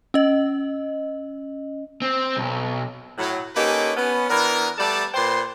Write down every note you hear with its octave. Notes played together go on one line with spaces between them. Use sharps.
C#4 D#5
C4
B1
A2 F#3
A#3 C#4 D#4 G4 A4 B4
B3 C#4
E3 B3 D4 A#4
G3 A3 B3 A4 D5 A5
A#2 B4 C5 G5 C6